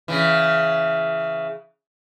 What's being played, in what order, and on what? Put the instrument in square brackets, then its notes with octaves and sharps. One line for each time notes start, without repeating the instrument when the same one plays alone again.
[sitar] C#3 E3